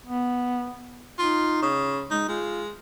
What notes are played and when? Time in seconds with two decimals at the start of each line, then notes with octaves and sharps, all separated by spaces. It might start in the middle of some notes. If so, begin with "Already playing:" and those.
0.05 B3
1.19 D#4 F4
1.62 C#3
2.11 G#3 D#4
2.29 G#3 F4